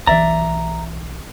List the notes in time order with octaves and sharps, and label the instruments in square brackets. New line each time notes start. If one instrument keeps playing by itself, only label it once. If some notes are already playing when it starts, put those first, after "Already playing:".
[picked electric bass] B1 E3 [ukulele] D5 E5 [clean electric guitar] A#5